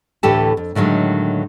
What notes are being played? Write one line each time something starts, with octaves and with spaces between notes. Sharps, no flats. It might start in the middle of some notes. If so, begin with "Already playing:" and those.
D2 A2 E3 G4 A4 A5
F2
A2 D3 D#3 F#3 G#3